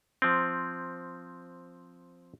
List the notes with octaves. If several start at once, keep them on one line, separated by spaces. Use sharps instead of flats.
F3 C4